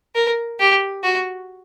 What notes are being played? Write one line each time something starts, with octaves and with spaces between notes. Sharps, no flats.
A#4
G4
F#4